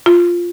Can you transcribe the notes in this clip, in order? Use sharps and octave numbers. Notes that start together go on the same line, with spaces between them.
F4